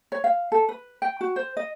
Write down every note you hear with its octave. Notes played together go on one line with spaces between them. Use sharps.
C#5
F5
A4
B4
G5
F#4
C5
D#5